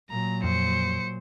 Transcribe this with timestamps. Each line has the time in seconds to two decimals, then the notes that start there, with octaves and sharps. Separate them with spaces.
0.10 A#2 F#3 A#5
0.44 F2 C5 C#7